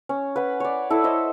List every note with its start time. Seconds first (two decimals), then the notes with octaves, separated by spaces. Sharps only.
0.09 C#4
0.36 B4 F#5
0.60 C#5 D5
0.90 E4 A4
1.04 C5 D#5 E5